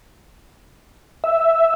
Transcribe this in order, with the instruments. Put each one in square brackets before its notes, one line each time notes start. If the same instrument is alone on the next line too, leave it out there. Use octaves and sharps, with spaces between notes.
[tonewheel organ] E5